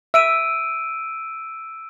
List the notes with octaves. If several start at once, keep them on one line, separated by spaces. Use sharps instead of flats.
E5 E6 D7 D#7